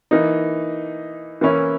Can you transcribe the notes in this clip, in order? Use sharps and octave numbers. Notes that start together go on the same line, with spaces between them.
E3 A#3 D#4
E3 A#3 C#4 E4